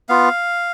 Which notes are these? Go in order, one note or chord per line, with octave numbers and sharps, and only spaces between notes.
B3 F4 F5